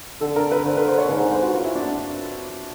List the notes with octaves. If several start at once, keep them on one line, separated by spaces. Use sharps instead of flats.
D3 A4
A#4
B4
D3 C5
B4
C5
C#5
G#2 B4
A#4
C5
F#4
F4
E4
D4